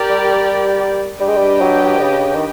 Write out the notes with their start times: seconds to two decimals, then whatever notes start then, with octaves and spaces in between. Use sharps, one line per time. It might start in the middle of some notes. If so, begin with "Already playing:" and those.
Already playing: G4 A#4 D5 G5
0.10 G3
1.19 G3 D4 G4 B4 D#5 G5
1.28 G#3
1.36 G3
1.61 F#3
1.98 D3
2.02 C#3
2.35 D#3